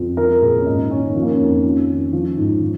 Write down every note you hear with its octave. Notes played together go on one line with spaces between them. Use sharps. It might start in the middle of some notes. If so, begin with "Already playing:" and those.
Already playing: F2
F3 A#4
A#2 G#4
C#4
G#2 D#4
D#3 C#4
F3 C#4
A#3
C#4
F2
D#3
D#3
F3
G#2
F3